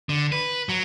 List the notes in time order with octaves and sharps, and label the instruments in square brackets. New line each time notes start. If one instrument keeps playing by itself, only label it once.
[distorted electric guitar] D3
B4
F#3